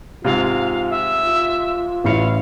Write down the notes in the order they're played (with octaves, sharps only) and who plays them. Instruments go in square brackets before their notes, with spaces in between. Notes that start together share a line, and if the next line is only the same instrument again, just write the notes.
[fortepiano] G#2 C3 [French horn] F4 [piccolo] F5
[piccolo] E5
[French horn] F4
[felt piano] A1 E4 C#7 [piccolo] F5